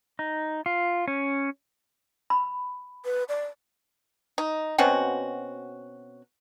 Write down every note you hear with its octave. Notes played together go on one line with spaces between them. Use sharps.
D#4
F4
C#4
B5
B4
D5
D#4
B2 C4 C#4 F#4